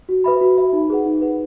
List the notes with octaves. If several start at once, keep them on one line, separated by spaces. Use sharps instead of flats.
F#4
B4 E5 B5
F#4
B4 E5 B5
D#4
G#4 B4 F#5
D#4
G#4 B4 F#5